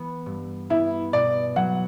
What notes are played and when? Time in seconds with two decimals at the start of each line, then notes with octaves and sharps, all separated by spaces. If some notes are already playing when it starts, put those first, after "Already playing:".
Already playing: E3 B3
0.26 G2
0.70 B3 E4
1.13 B2 D5
1.56 F#3 F#5